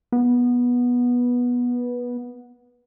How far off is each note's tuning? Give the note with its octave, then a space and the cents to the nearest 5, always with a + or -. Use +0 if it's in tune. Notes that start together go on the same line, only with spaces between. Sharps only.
B3 -15